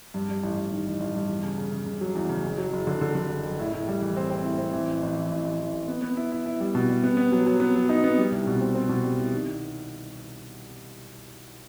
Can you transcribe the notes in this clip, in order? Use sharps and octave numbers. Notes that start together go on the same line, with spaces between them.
G2
G2
A1
A1
D#3
A1
A1
G2
E2
C#3
C#3
C#3
C#3
F#3
E2
C#3
F#1
F#3
F#1
D3
D3
D3
F#1
F#1
A2
A2
G3
E3
C4
C4
A2
C4
E3
A1
A1
E3
A1
A1
E3
A1
B3
B3
E4
E4
E4
G3
B2
G3
B3
B3
F#3
F#3
B3
F#3
D#4
B3
G3
C2
B2
C4
C4
B2
G3
C2
D#3